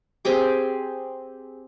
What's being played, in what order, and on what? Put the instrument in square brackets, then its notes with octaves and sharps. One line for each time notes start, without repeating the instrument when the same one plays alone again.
[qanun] C4 G4 G#4 D6